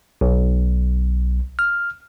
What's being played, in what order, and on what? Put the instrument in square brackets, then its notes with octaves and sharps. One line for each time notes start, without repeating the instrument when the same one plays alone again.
[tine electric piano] B1
F6